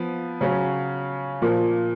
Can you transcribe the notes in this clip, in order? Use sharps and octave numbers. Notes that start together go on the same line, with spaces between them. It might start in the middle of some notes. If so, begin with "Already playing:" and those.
Already playing: F3 B3
C#3 F#3 C#4
A#2 F3 A#3